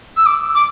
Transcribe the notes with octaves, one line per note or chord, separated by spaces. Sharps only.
E6
D6
D6